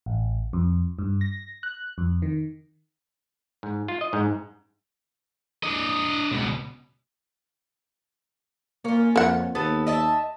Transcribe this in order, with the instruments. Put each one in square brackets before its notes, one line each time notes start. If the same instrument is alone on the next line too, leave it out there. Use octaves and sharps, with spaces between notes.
[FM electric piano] A1
F2
G2
A#6
F#6
F2
D#3
[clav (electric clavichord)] G#2
F4
D#5
G#2
[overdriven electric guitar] D4 D#5
C#2 B2
[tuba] A#3 [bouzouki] C#4 F4
[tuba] F2 [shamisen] A#3 F#5
[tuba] D#2 [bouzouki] B3 A4 B4
[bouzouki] D#5 E5 A5